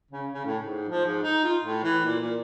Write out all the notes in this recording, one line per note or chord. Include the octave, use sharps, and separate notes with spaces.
C#3
C#3
A2
G#2
F3
G#2
D#4
F4
A2
E3
A#2
A#2